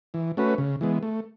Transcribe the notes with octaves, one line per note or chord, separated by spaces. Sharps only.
E3
A3 C#4 F#4 B4
C#3
E3 G#3 B3
A3